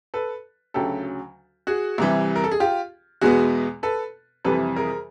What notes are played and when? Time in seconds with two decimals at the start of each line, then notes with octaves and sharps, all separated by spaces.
0.14 A4 B4
0.74 D2 C#3 F#3 G4 A4
1.67 F#4 G#4
1.98 C2 C3 E3 G3
2.36 A#4
2.44 A4
2.51 G#4
2.60 F4 G4
3.21 E2 B2 G#3 B3 F#4 G#4
3.83 A4 B4
4.45 F2 C3 E3 G3 A4 B4
4.76 G#4 A#4